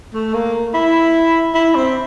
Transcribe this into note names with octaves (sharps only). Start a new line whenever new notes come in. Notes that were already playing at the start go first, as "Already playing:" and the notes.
A3
A#3
E4
E4
C4